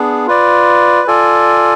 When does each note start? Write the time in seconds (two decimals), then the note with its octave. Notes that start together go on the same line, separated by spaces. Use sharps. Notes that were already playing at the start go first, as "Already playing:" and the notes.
Already playing: B3 D4 G#4
0.27 F4 B4 D5
1.08 F4 A4 D5 G#5